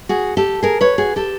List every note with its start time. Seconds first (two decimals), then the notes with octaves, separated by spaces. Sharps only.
0.09 F#4 G#4
0.37 G4 A4
0.63 G#4 A#4
0.81 B4 C#5
0.98 F#4 G#4
1.16 G4 A4